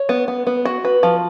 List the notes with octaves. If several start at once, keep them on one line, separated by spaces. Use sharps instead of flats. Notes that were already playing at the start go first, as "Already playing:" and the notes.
Already playing: C#5
B3
B3
B3
F#4
B4
F3